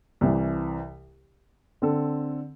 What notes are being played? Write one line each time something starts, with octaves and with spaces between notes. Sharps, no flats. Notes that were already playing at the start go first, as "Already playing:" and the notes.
C2 C3 E3
D3 C4 A4